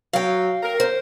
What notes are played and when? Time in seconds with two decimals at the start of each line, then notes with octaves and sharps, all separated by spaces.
0.13 F#3 F5 G5
0.63 A#4
0.80 C5